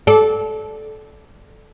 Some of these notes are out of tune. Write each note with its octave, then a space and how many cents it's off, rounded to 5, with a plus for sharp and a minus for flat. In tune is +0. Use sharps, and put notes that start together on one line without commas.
A4 -20 D5 +0